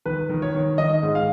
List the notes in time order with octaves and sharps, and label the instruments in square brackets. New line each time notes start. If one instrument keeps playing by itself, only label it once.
[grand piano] D#3 B4
D#3
C#5
D#3
D#3 D#5
G#2
F5